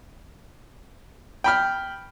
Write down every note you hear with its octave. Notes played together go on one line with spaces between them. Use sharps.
G5 B5 F6